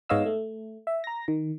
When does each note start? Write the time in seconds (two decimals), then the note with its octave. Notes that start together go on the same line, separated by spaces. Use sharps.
0.09 G#2 B3 C#5 D#5 F5 E6
0.26 A3
0.87 E5
1.04 A#5 A#6
1.28 D#3